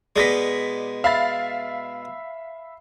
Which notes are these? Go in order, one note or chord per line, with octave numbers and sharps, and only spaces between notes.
B2 G#3 D5 A#6 B6
E5 F5 B5 A6